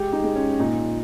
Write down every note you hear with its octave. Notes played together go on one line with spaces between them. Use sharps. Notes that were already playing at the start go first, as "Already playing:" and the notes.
Already playing: G#3 G4
D#4
G#3
C#4
A#2 D#4